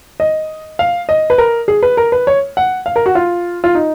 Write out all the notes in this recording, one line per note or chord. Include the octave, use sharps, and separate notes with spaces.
D#5
F5
D#5
B4
A#4
G#4
B4
A#4
B4
C#5
F#5
F5
A#4
F#4
F4
F4
D#4